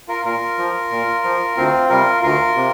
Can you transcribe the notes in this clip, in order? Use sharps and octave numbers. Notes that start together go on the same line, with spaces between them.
F4 A#4
A#2 F4 A#4
F3
A#2
F3
D2 C4 F4
C3 G3 F4 A#4
D2 F4 A#4
C3